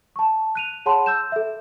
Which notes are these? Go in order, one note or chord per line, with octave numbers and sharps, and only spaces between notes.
A5 C#6
F#6 D#7 F7
G#4 C#5 F#5 A5 B5 C6
E6 G6 E7
A4 E5